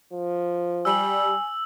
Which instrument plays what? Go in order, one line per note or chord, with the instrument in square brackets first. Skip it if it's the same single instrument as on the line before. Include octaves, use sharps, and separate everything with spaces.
[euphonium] F3
[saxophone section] G3 [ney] G#5 [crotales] E6 F#7